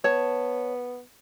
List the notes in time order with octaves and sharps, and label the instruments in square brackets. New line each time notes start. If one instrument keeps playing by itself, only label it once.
[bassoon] B3 [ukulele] C#5 A5